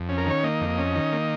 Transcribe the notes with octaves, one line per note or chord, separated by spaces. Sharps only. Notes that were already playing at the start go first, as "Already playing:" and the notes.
Already playing: F2
C#4
A#4
D#3 C#5
A#3 D#5
F2
C#4
D#3
A#3